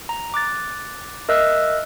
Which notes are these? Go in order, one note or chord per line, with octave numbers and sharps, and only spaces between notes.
A#5
D6 F#6 A6
A#4 D#5 E5 E6 F#6